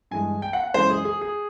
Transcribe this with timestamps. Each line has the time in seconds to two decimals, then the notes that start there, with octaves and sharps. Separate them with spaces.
0.11 G2 E3 G#3 G#5
0.42 G5
0.53 F#5
0.64 F#5
0.74 F#2 C#3 E3 G#3 C5
0.90 G#4
1.05 G#4
1.21 G#4